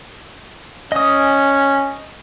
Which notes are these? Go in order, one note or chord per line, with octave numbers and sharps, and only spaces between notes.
C#4 D#5 D#6